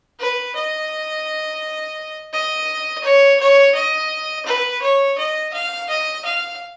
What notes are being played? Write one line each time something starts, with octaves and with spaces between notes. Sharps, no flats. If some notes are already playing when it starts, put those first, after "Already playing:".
B4
D#5
D#5
C#5
C#5
D#5
B4
C#5
D#5
F5
D#5
F5